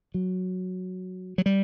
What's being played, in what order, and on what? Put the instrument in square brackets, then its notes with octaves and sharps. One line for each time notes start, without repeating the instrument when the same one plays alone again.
[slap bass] F#3
F#3
G3